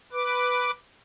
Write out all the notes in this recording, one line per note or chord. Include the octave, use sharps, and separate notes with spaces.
B4 D6